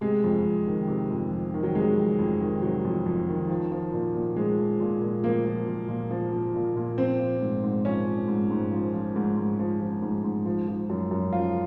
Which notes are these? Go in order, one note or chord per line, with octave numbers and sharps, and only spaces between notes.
C3 G#3
F2
F2
D#3
C3
F2
F2
D#3
F#3
C3 G#3
F2
F2
D#3
C3 F#3
F2
F2
D#3
F3
F3
A#2
A#2
F3 G#3
F3
A#2
A#2
F3 A#3
F3
A#2
A#2
F3
F3
A#2
A#2
F3 C4
F3
G#2
G#2
F3 C#4
F3
G#2
G#2
F3
F3
G#2
G#2
F3
F3
G#2
G#2
F3
F3
F#2
F#2
F3 F4